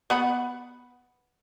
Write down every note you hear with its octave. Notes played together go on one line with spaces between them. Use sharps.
B3 F#5 B5